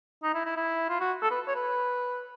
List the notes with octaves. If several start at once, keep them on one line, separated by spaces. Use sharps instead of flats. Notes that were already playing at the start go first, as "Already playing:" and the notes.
D#4
E4
E4
E4
F4
F#4
A4
B4
C#5
B4